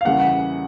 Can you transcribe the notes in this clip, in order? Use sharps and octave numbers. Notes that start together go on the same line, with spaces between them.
F5
E2 C#3 E3 G3 F#5
F#5